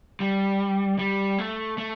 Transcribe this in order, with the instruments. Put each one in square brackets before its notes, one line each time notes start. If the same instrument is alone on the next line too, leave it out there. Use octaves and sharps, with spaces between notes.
[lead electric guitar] G3
G3
A3
A3